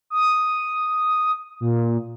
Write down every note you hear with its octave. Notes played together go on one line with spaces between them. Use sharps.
D#6
A#2